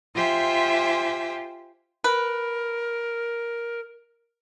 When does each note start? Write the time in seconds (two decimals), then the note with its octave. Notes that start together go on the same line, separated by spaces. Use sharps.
0.14 F4 G4 C5 E5 G#5
2.04 A#4 B4